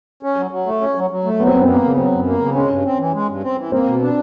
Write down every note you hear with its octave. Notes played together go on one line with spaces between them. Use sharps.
C#4
F#3
F#3
A3
C#4
F#3
F#3
A3
F#3 B3
C4
F#2 B3
C4
A#3 B3
C#3
F#3 C4
F#2
A#3
C#3
G#3 C#4
G2
C4
E3
G#3
G2
C4
E3
A#3 C4
B2
D4